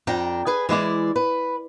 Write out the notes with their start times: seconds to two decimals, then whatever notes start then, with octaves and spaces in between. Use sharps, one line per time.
0.07 F2 D4 G5 A#5
0.47 G#4 B4 G#5
0.69 E3 G#3 E4 D5
1.16 B4